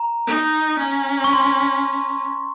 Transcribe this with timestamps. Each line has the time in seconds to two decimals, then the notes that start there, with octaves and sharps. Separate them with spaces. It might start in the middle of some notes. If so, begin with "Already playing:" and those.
Already playing: A#5
0.27 D#4
0.79 C#4
1.24 C#6
1.33 C6